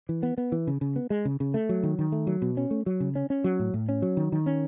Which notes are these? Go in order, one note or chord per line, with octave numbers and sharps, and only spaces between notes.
E3
B3
B3
E3
C#3
C#3
B3
G#3
C#3
C#3
A3
F#3
D#3
D#3
A3
F#3
B2
C#4
A3
F#3
C#3
C#4
C#4
F#3
A2
A2
C#4
F#3
D#3
D#3
C#4